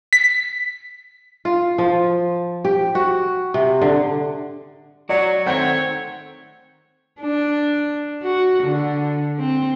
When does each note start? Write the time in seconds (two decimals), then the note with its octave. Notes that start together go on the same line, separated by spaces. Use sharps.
0.13 B6
1.45 F4
1.78 F3
2.65 G4
2.95 F#4
3.54 C3
3.81 D3
5.09 F#3 F#4 D5
5.46 D#3 A3 C4 C#5 F#5 G6
7.21 D4
8.22 F#4
8.63 D3
9.39 C4